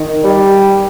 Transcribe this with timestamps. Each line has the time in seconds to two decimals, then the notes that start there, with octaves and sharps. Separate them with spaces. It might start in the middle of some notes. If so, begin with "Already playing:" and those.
Already playing: D#3
0.24 G3